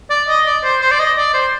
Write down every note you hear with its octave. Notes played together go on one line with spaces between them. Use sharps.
D5
D#5
D5
C5
C5
D5
D#5
D5
C5